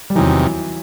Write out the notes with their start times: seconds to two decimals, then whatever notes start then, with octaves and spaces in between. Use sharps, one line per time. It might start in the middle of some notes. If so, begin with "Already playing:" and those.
0.10 G3
0.15 E2 C3 D#3 E3 F#3